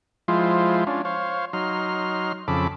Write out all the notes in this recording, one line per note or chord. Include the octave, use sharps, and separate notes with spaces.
F3 G#3 E4 F4 C5
C#4 D4 F4
C5 C#5 F5
F#3 D#4 C6 F6
F2 C#3 A4 B5 D6